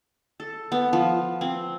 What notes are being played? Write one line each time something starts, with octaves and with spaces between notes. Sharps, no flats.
A4
B3
F3
C4